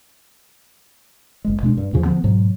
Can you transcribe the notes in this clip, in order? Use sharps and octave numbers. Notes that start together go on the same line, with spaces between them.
F#1 G#3
B2 G#3 D4
G2
E2 A#2 C#3 F3
D3 F3 B3
G#2 B2 F#3